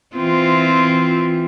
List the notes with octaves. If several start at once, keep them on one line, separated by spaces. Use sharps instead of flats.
E3 C4 F4